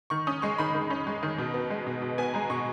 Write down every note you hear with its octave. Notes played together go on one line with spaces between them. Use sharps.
D#3 C#6
C#4 D#6
G#3 C#6
D#3 B5
D#3
C#4
G#3
D#3
B2
B3
G#3
B2
B2
B3 G#5
G#3 A#5
B2 C#6